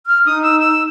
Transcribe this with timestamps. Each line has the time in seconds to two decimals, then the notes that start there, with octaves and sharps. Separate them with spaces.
0.06 F6
0.26 D#4 D#6
0.43 E6
0.60 E6